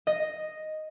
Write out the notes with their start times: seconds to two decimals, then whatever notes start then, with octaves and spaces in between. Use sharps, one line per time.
0.07 D#5